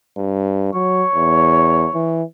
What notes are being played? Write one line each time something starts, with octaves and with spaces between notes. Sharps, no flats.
G2
F#3 C#5
E2
E3